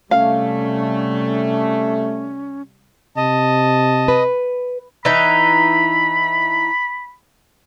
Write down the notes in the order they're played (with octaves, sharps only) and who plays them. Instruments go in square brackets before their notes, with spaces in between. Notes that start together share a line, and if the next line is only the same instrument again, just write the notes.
[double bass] C3 G3 [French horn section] A3 [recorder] C#4 [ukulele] F5
[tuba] C3 [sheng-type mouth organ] D#5 [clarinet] A5
[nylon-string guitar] B4
[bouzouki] E3 D#4 [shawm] B5